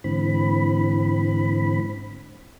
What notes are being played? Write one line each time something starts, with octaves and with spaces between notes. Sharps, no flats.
G#2 D3 E3 C4 B5